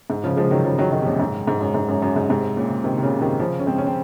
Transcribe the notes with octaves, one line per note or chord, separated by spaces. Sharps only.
G#2
C#3 F3
F3 G#3
D#3 F#3
C#3 F3
D#3 F#3
D#3 F#3
C3
F#2 A#2
G#2
G#2
F#2
G#2
F#2
F#2
G#2
G#2 C3
A#2 C#3
C3 D#3
C3
A#2 C#3
C3 D#3
C#3 F3
C#4
G#3 C4
C#4
C4